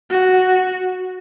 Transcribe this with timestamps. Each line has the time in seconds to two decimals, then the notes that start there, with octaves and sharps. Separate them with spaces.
0.11 F#4